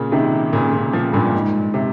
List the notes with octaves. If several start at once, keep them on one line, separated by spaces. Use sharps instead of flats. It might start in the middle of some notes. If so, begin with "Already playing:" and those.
Already playing: A#2 C#3
C3 D#3
A#2 C#3
A#2 C#3
C#3 F3
G2 A#2
G#2
C3